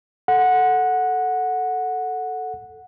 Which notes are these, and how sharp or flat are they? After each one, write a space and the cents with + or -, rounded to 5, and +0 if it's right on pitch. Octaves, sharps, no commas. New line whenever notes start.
A4 +0 F#5 -10